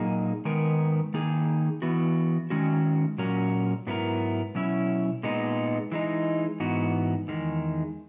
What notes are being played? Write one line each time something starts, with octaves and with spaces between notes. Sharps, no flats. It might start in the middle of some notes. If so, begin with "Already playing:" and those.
Already playing: A#2 F#3 A#3 D#4 G#4
D#3 G#3 B3 D#4 A#4
D#3 A#3 D#4 G#4
E3 B3 F#4
D#3 G#3 C#4 F#4
A#2 F#3 C#4 F#4 A#4
G#2 F#3 B3 E4 A#4
B2 F#3 C#4 E4
A#2 G#3 B3 D#4
E3 G#3 D#4
G#2 E3 B3 D#4 F#4
E2 D#3 G#3